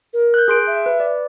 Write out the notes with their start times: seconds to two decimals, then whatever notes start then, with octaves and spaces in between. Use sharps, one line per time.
0.13 A#4
0.34 F#6 G6
0.48 G#4 C6 D7
0.67 E5
0.86 B4
1.00 D5